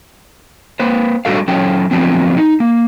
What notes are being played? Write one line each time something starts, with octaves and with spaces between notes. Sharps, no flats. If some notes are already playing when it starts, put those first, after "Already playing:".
A#3 B4 C5
G3 A3 D4 F#4 A4 F5
F#3 C#4 A4 G5
D3 F3 F#3 A3 B3 C4
D#4
A#3